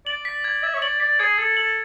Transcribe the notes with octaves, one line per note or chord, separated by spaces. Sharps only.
D5 F#7
B6
G#6
E5 G#6
C#5
D5 F#7
D5 B6
G#4 G#6
A4 G#6
A4 F#7